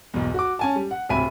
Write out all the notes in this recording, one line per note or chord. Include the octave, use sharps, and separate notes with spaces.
B1 E2
F#4 D6
C#4 G#5 A5
G3
F#5
D1 C3 E5 G#5 B5 D#7